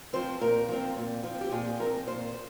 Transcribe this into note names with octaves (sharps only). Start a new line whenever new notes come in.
F3 C4 C5
A#2 A#4
F3 C4
A#2
F3 C4
G4
A#2 G#4
F3 C4 A#4
A#2 C5